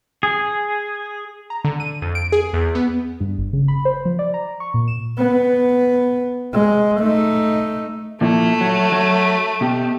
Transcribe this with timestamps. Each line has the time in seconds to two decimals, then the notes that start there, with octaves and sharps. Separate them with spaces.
0.23 G#4
1.50 A#5
1.65 D3
1.80 D#7
2.02 F2
2.15 D7
2.32 G#4
2.53 E2
2.75 B3
3.20 G2
3.38 G1
3.53 C#3
3.68 B5
3.85 C5
4.05 F3
4.19 D5
4.34 A#5
4.60 C#6
4.74 A#2
4.88 E7
5.18 B3
6.53 G#3
7.00 A3 D#4
8.21 A#2 F3 A3 E4
8.61 F#3
8.92 F#3
9.61 B2 G4